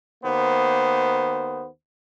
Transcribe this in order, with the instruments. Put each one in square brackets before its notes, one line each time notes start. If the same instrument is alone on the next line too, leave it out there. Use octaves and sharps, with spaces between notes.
[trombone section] D#2 A#3 B3 C5